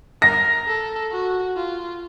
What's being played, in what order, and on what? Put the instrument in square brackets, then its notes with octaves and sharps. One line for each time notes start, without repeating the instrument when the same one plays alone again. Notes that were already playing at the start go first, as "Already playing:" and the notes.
[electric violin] A#4 [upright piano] A#6
[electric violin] A4
F#4
F4